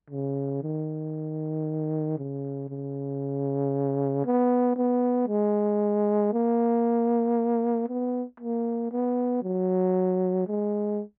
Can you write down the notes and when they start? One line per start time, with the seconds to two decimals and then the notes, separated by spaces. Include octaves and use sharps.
0.10 C#3
0.63 D#3
2.18 C#3
2.69 C#3
4.25 B3
4.76 B3
5.28 G#3
6.33 A#3
7.88 B3
8.40 A#3
8.92 B3
9.43 F#3
10.47 G#3